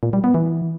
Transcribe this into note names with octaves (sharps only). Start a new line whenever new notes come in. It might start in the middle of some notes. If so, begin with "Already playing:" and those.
A#2
G3
B3
E3